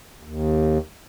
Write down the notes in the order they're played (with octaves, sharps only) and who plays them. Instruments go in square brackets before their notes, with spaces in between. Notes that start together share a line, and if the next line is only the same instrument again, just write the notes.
[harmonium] D#2